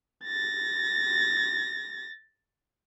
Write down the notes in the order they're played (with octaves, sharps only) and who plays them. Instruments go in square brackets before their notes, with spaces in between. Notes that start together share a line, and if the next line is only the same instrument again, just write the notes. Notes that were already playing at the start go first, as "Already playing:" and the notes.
[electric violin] A6 A#6